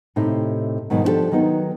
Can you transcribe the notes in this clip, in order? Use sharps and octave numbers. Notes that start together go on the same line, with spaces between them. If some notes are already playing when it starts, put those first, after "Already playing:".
A2 C3 D#4 G4
G#2 B2 D#3 F#3
F3 D4 E4 F#4 G4 A4
D#3 F#3 B3 D#4